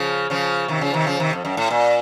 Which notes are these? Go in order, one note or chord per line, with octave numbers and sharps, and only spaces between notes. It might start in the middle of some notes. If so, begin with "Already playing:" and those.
Already playing: C#3 F3
C#3 F3
C3 D#3
C#3 F3
C3 D#3
C#3 F3
C3 D#3
F2
F#2
A2
A#2